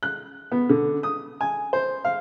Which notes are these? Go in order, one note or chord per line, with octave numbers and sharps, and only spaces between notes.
F#6
B3
D3
D#6
G#5
C5
F5